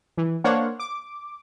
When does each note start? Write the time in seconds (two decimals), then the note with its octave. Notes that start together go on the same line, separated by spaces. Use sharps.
0.17 E3
0.44 A#3 D4 C5 C#5 F5 F#5
0.80 D6